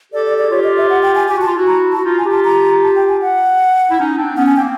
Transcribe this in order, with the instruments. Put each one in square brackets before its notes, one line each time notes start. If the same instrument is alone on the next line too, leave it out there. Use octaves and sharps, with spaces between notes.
[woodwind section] G4 A4 [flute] D5
[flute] D5
[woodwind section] G#4 [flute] D5
[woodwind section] F4 G4 [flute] C#5
[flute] D#5
E5
F#5
G5
G#5
[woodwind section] G4 [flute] G#5
[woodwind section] F#4 [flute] A5
[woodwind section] F4
E4 F#4
[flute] A#5
[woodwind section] F#4 [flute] A5
[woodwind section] D#4 F4
[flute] G#5
[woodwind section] F4 G4
[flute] A5
A#5
A5
G5
G#5
F#5
[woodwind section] E4
C#4 D#4
C4 D4
[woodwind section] B3 C#4 [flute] F#5
[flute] G#5
[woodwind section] A#3 C4 [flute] G5